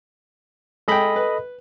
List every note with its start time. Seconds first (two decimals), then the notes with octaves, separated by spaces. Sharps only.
0.88 G#3 A4 D#5 G5 B5
1.16 B4